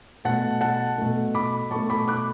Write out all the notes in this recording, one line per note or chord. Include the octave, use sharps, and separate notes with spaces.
B2 A3 F#5 A5
F#5 A5
B2 A3
B5 D6
B2 A3 A5 C#6
B5 D6
D6 F#6